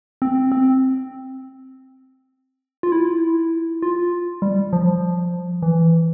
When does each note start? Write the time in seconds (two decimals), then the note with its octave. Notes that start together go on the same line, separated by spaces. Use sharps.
0.22 C4
0.52 C4
2.83 F4
2.92 E4
3.82 F4
4.42 G3
4.73 F3
5.63 E3